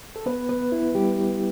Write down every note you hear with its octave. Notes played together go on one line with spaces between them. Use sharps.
A4
B3 B4
B3 B4
E4
G3 G4